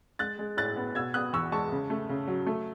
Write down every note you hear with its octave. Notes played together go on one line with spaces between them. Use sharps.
G#3 F#6 A6
G#3
A2 F#6 A6
B3
B2 E6 G#6
B3 D#6 F#6
E2 C#6 E6
G#3 A5 C#6
C#3
A3
C#3
F#3
A3